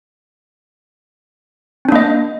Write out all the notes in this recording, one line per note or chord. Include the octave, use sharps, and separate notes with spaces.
A#3 C4 D4 D#5